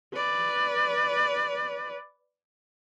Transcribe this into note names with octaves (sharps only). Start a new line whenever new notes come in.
B4 D5